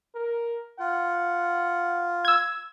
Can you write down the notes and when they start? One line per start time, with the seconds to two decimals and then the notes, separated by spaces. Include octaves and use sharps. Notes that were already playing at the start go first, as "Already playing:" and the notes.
0.15 A#4
0.79 F4 F#5
2.25 E6 G#6